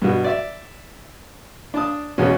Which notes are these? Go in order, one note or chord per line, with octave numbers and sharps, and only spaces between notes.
G2 B2
D5 E5
D4 A5 D#6
E2 B2 G#3 C#4